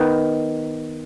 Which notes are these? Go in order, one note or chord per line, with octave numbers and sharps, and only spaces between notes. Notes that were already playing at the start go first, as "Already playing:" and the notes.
Already playing: D#3 B3